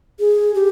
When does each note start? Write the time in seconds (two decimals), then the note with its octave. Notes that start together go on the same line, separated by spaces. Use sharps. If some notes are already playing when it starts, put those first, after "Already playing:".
0.20 G#4
0.55 G4